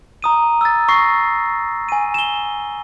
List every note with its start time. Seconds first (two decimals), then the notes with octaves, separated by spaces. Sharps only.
0.22 A#5 D#6 D#7
0.61 E6 A6
0.89 C#6 A#6 C7
1.89 G#5 D#7
2.14 E7 G7